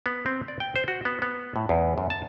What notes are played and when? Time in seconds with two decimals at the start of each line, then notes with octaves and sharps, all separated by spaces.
0.06 B3
0.26 C4
0.48 D5
0.60 G5
0.76 C5
0.88 F#4
1.05 B3
1.22 B3
1.56 A2
1.69 E2
1.98 F#2
2.10 A5